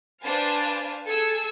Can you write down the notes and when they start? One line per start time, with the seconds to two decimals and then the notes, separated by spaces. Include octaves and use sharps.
0.23 D4 B4 C5 F5 G#5 A5
1.07 G#4 A4 G#5 E6